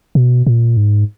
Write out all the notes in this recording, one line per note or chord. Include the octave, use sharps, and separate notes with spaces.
B2
A#2
G#2